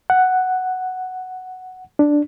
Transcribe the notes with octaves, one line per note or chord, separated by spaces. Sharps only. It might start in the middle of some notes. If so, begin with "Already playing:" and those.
F#5
D4